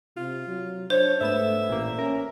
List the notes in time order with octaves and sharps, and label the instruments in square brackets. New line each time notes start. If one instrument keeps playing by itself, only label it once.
[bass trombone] C3 [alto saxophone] F4
[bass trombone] F#3
[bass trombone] D4 [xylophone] C5 [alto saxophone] C#5
[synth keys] G#2 B3 E7 [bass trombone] A3 [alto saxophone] E5
[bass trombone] A1 [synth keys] A#2 A#3
[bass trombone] C#4 [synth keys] A#4